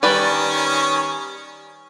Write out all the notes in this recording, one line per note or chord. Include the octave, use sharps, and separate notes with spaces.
D#3 G3 C#4 B4 C#5 D5